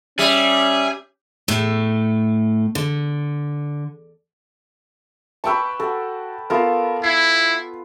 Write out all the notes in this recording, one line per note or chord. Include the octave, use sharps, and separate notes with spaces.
G3 C#4 G#4 E5
A2 A3
D3
B4 G5 A5 C#6 E6
F#4 A4
B3 F4 A4 A#4
E4 C7